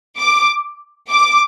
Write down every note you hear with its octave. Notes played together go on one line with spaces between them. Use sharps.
D6
D6